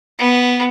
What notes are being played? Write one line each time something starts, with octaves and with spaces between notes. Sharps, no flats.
B3